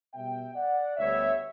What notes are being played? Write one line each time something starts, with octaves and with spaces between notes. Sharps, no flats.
B2 G3 B3 E5 G5
D5 F#5
D2 D3 G3 B3 C#5 E5